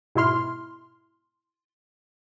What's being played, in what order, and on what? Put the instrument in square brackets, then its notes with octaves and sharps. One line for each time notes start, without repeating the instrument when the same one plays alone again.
[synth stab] G#2 B2 E4 C6 F6